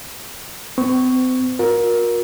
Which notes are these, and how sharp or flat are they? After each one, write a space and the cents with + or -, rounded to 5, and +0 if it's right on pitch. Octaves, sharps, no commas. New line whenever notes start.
C4 -40 C#6 +0
F#4 -45 A#4 +20